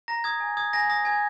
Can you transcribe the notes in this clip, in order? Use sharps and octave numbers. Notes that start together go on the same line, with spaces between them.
A#5 A#6
D#6 G#6
G#5
D#6 G#6
G#5 A#6
D#6 A#6
G#5 G#6